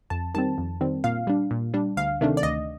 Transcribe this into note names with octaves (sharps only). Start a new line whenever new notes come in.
F2 A5
D#3 G3 C4 A5
F2
D#3 G3 C4
A#2 F5
G3 D4
A#2
G3 D4
D2 F5
C3 D#3 A3 D4
D5
D2 D#5